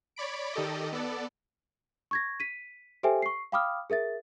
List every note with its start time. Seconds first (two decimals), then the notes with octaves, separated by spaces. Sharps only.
0.16 C#5 D5 B5 D7
0.53 D#3 G4 A4 D5 D#5
0.92 B3 A4 D5
2.11 C#6 G#6 A#6
2.40 B6 D#7
3.03 G4 A4 C5 E5 G5 G#5
3.22 C#6 C7
3.52 F5 G5 B5 D6 D#6 F6
3.90 G#4 A#4 E5 A6